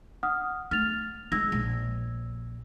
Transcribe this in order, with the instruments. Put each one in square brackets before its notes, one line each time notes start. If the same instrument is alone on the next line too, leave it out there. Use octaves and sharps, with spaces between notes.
[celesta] F#5 D#6 F6
[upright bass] A3 [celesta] F6 A6 F7
[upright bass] G#3 [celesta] E6 G#6 A#6
[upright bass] A#1